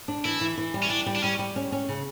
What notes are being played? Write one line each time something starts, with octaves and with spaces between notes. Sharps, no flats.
D4
E3 E4
E3
E3
G3
C#4
G3 D4
G3
D4
G3 C#4
G3
C#4
C#4
C#3